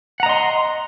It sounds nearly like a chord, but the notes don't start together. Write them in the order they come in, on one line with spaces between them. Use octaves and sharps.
F#5 A#5 D#5 C6